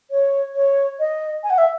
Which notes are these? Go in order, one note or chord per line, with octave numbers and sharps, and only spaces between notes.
C#5
C#5
D#5
G#5
F#5
E5